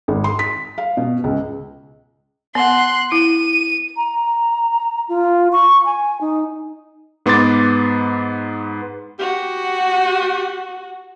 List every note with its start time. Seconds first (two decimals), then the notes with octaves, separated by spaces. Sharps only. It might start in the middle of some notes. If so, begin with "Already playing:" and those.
0.08 G#1
0.24 C6
0.39 B6
0.78 F5
0.97 B2
1.24 C#2
2.55 B3 F#5 C6 F#6
3.12 E4 D#7
3.97 A#5
5.09 F4
5.52 C#6
5.86 G#5
6.21 D#4
7.26 G#2 B3 C6 D6 A6
9.19 F#4 G4